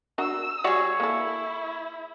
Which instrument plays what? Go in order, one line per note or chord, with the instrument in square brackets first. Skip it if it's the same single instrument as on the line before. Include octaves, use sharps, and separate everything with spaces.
[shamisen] D4 F#4 A#4 [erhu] E6
[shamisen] G3 F#4 D5 [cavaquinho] G#4 C#5
[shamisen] A#3 A4 [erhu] E4